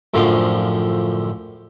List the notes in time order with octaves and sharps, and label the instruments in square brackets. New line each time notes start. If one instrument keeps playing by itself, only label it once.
[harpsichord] F#2 A2 D3 F3 F5